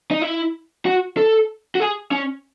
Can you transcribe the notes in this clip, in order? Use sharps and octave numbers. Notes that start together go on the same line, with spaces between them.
D#4
E4
F#4
A4
F#4
G#4
C#4